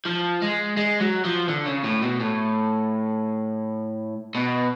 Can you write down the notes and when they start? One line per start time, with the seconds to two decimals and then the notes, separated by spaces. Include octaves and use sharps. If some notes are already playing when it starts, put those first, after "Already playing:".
0.05 F3
0.42 G#3
0.77 G#3
1.00 F#3
1.25 F3
1.49 D3
1.66 C#3
1.84 A2
2.02 B2
2.20 A2
4.35 B2